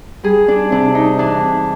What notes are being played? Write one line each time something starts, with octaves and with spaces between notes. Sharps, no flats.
G3 G#4
D4
C3 D4
D#4
E3 D4